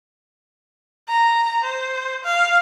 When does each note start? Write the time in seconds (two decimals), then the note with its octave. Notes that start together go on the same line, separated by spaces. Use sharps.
1.08 A#5
1.63 C5
2.24 F5